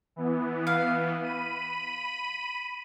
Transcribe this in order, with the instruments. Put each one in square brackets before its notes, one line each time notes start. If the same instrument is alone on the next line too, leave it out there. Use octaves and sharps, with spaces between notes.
[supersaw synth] E3 B3
[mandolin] F5
[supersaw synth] B5 D#7